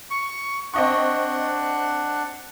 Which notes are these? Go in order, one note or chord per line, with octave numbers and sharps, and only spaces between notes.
C#6
C4 D4 D#5 F#5 C#6